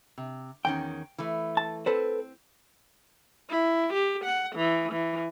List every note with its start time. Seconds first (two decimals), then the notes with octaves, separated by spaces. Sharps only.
0.18 C3
0.65 E2 D#3 C#4 G5
1.18 E3 A3
1.57 A5
1.86 C4 A4 B4 C5
3.50 E4
3.93 G4
4.24 F#5
4.55 E3
4.92 E3